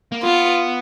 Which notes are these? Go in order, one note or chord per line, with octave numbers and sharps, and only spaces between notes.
A#3
B3 F4